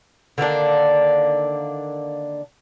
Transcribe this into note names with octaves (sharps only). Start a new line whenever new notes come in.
D3 D#3 A#3 D4